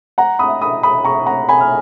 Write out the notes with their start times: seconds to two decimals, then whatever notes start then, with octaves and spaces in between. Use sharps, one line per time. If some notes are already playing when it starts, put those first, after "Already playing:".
0.18 F#5 A#5
0.39 B5 D#6
0.61 B5 D#6
0.83 B5 D#6
1.05 A#5 C#6
1.26 F#5 A#5
1.49 G#5 B5
1.61 F6